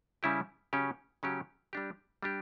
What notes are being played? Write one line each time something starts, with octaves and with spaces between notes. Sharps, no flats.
C#3 G3 C#4 E4 G4
C#3 F#3 C#4 G4
C#3 F#3 C#4 G4
G3 D4 G4
G3 D4 G4